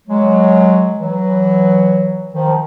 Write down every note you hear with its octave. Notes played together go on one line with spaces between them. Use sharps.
F#3 G#3
E3 F#3
D#3 F3